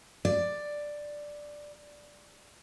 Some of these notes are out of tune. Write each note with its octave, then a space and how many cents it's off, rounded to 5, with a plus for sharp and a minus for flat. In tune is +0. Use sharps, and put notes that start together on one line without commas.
D5 +5